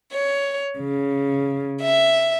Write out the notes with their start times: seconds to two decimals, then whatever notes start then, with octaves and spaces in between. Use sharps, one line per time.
0.12 C#5
0.78 C#3
1.82 E5